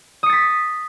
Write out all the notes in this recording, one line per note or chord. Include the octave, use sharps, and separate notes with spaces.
D#6 A6 B6 C#7